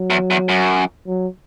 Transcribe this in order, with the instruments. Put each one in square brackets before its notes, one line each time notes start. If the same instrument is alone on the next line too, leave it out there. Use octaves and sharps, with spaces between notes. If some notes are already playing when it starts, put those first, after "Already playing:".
Already playing: [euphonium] F#3
[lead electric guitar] E2
E2
F#2
[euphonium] F#3